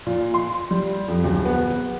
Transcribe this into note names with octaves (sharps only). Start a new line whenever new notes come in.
A#2
C6
G3
F2
D1
B3